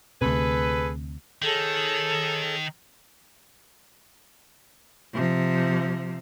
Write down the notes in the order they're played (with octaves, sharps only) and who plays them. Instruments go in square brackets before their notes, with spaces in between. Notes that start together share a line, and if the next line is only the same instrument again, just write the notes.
[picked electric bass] D2 C3 [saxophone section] G#4 A4 B4
[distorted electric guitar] D#3 [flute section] G#4 A4 C#5
[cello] C3 F3